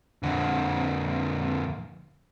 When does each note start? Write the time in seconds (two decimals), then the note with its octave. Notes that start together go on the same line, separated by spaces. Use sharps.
0.23 F2 D3